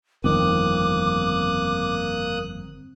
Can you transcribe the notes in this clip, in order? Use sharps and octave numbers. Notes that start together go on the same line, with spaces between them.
G1 F2 D#3 A#3 C4 D6 D#6 F#6